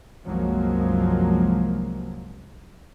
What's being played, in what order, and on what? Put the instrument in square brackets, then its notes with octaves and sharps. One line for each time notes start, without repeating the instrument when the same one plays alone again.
[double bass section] C2 F#2 F3 F#3 G#3 A#3